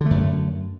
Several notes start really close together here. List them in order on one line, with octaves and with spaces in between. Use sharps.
D3 A3 F#2